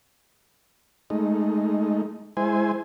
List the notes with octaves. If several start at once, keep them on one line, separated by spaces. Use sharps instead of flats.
G#3 A3 D#4
G#3 E4 C5 G#5